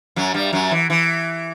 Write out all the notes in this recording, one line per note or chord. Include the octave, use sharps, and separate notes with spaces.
F#2 F#3
G2 G3
F#2 F#3
E3
E3